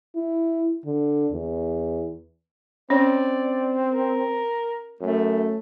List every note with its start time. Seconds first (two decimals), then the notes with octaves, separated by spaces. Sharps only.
0.16 E4
0.86 D3
1.32 E2
2.90 C4 C#4 C#5 D5
3.90 A#4
5.01 F#2 A3